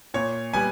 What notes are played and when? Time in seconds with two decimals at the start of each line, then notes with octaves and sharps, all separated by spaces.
0.14 A#2 C#5
0.53 G3 B3 G#5